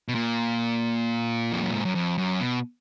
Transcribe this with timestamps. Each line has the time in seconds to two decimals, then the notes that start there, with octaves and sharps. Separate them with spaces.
0.08 B2
0.15 A#2
1.52 F2
1.63 F#2
1.73 G#2
1.85 F#2
1.95 F2
2.18 F#2
2.40 B2